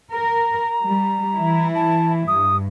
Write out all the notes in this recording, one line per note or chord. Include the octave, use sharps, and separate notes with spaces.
A#4 A#5
G3
E3 E4
A5
G2 D#6